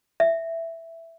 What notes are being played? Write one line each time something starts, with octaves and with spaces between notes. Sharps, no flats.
E5